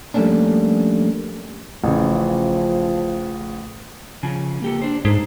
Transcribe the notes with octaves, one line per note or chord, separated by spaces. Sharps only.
F3 G3 A3 A#3 C#4 D4
A1 C#3 F3
C#3 F3 G#5
A#3 G4 A4
D4 C5
G#2 D#4 A4 C5